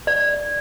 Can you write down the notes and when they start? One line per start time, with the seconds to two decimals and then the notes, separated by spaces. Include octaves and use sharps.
0.07 D5